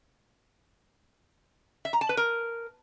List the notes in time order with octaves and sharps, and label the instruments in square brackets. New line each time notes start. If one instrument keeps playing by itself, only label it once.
[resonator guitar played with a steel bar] E5
A#5
A5
B4
A#4